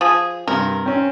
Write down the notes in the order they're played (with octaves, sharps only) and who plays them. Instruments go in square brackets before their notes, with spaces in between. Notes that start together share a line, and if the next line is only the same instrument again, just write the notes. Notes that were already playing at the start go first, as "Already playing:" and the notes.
[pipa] F3 G#4
[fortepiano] G2 C3 [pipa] A#4
[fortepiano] C4 C#4